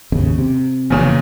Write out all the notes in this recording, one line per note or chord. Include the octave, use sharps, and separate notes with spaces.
G#1 D#2 C#3
C3
F1 E2 A#2 C#3